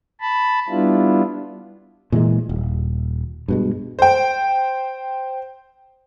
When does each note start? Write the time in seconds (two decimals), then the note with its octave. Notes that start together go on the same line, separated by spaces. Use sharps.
0.20 A5 B5
0.69 G3 B3 D4 E4 F4
2.12 A#2 E3 F3 G#3
2.49 D#1
3.48 G2 B2 G#3
3.99 C5 G5